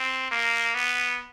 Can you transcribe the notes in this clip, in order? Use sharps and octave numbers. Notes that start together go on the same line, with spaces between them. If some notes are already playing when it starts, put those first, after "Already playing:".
Already playing: C4
A#3
B3